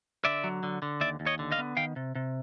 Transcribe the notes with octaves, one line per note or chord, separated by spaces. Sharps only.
D3 D5 E5
F#3
D3
D3
D#2 D5 E5
D#2
C#5 D#5
D3
D#5 F5
B3
D#3 F5 G5
C3
C3